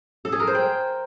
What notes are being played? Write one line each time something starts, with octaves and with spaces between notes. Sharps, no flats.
A4
G#4
A#4
C5
G5